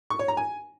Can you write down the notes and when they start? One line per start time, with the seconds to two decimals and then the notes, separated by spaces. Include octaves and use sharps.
0.10 C#6
0.19 C#5
0.28 A#5
0.37 G#5